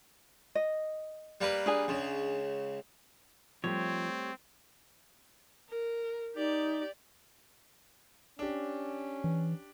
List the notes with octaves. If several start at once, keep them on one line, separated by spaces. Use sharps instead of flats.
D#5
G3 A#3 B4
D4 G#4 G#5
C#2 C#3
F3 G3 A3 C4 G4 C#5
A#4
D#4 G4 D5
C#4 D4 G4
E3